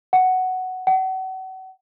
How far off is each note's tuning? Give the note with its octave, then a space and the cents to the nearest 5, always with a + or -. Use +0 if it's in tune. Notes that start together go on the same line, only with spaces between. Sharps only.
F#5 +5
F#5 +35